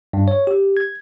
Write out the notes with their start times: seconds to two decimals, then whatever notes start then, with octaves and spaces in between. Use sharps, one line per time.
0.13 G2
0.28 C#5
0.47 G4
0.77 G#6